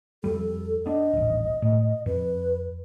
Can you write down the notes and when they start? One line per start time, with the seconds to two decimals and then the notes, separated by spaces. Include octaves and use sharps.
0.24 F2 G3 A4
0.86 B3 D4 D#5
1.13 D#1 A1
1.62 A2
2.06 F2 B4